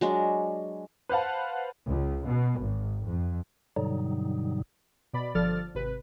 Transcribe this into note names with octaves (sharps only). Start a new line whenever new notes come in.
F#3 G#3 D4
B4 C5 F5 F#5 A5
C#2
B2
G#1
F2
G2 B2 D3 F#3 G3 D#4
B2 D5 B5
G1 F3 A4 D5 F6 A6
G#1 C3 B4